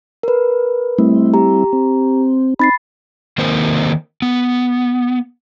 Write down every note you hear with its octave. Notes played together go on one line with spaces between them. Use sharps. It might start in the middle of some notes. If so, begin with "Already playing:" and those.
A#4 B4
G3 A3 C4 E4
G4 A#5
C4
C4 D#4 B5 A6 C7
D#3 A#3 C4 D#4 A#4 C5
B3